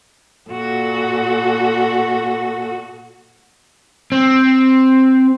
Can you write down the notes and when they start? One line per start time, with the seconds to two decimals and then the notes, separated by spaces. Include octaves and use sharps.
0.50 A#2 F#4 A4
4.12 C4